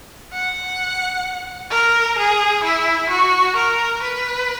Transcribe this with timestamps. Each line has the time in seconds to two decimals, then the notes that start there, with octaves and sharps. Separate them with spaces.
0.33 F#5
1.71 A#4
2.18 G#4
2.64 E4
3.10 F#4
3.56 A#4
4.03 B4